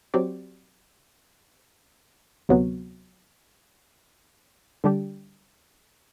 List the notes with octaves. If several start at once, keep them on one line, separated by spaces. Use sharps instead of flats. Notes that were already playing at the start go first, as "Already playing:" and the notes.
F#3 C4 G4 D5
D2 C3 F#3 B3
D3 G3 D4 G4